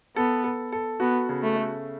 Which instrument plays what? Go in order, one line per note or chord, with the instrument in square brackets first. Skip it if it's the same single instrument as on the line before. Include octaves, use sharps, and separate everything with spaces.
[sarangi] B3 [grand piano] A4
[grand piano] A4
A4
[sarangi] B3 [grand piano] F#4
[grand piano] C#3
[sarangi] A3
[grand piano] A3